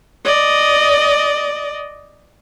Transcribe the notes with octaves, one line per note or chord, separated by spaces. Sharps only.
D5 D#5